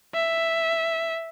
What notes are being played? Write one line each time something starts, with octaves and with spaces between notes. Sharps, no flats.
E5